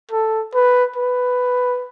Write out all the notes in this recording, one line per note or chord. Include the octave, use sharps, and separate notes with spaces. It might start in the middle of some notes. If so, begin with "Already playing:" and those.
A4
B4
B4